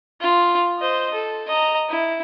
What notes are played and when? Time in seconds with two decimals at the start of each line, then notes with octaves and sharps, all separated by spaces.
0.21 F4
0.78 C5 D#5
1.13 A4
1.47 D#5 A#5
1.89 E4